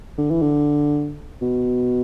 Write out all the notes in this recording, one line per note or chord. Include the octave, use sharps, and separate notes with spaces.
D3
E3
D3
B2